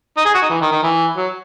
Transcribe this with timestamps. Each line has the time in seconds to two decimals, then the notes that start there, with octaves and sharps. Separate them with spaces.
0.17 D#4
0.25 G#4
0.34 F#4
0.42 D#4
0.50 E3
0.61 D#3
0.72 D#3
0.83 E3
1.17 F#3